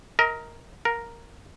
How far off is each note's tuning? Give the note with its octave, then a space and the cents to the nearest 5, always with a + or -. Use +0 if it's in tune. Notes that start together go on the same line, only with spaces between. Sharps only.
A#4 +0 D#5 +35
A#4 +0 F5 +45